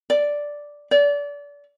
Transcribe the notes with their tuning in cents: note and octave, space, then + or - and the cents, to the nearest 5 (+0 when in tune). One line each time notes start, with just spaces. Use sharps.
D5 -5
D5 -30